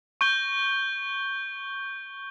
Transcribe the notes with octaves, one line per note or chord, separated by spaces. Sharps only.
C#6 G6 G7